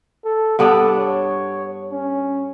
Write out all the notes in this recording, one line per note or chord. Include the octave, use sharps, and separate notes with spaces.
A4
G2 B3 D4 A4
C#5
C#4